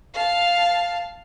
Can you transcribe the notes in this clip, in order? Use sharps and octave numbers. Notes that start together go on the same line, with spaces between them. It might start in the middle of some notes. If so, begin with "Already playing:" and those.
F5 A5